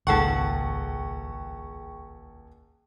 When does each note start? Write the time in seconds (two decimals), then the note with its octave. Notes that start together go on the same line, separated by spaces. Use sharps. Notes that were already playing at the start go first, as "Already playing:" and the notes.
0.07 D#1 G#1 C#2 G#4 A4 F#5 G5 C#6